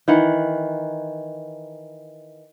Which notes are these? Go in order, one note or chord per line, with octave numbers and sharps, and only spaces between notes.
D#3 E3 F#5